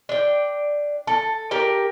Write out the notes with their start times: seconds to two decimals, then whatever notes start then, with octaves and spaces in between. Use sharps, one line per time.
0.09 D4 G5
1.07 A4
1.51 G4 A#4 G5